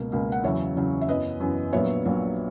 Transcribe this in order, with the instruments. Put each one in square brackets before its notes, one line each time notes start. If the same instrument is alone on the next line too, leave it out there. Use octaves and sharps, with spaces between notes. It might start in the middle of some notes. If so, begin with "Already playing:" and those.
Already playing: [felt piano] C#2 B2 A#3
C#2 B2 A#3
F#5
E2 C#3 F#3 C#5 E5
E2 C#3 F#3
E5
F#2 E3 B3 B4 D#5
F#2 E3 B3
A#1 A#2 F#3 B3 C#5 E5
A#1 A#2 F#3 B3